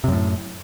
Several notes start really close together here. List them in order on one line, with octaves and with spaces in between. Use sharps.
C3 F#2 A2